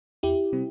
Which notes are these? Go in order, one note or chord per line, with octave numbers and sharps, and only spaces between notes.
E2 E4 G4
C3 G3 C4